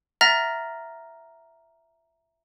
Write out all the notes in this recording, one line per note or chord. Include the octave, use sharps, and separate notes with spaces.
E5 F#5 A#5 F6 A6 A#6